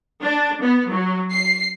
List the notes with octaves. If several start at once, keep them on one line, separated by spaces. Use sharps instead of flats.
D4
B3
F#3
C7